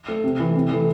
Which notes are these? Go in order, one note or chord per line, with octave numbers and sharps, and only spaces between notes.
A3
C3
E3 A3
C3
E3 A3